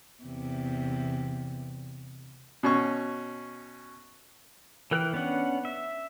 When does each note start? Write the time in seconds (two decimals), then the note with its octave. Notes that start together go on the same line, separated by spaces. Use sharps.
0.23 E2 C3
2.63 B2 C#4 C#6
4.91 E3 A#4 G5 F#6
5.13 B3 C#4 D4 F#5
5.65 E5